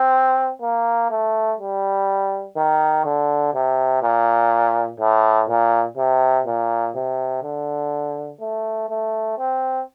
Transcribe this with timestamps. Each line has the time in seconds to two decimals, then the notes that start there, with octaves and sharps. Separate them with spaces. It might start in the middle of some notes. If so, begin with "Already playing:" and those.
Already playing: C4
0.62 A#3
1.10 A3
1.60 G3
2.57 D#3
3.05 D3
3.54 C3
4.03 A#2
5.00 A2
5.49 A#2
5.98 C3
6.46 A#2
6.95 C3
7.43 D3
8.41 A3
8.89 A3
9.38 C4